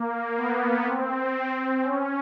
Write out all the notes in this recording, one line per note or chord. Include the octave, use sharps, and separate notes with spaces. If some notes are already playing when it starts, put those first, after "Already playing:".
Already playing: A#3
B3
C4
C#4